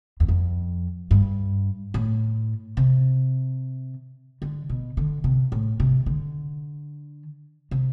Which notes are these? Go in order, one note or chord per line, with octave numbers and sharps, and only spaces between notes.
E2
F2
G2
A2
C3
D3
B2
D3
C3
A2
C3
D3
C3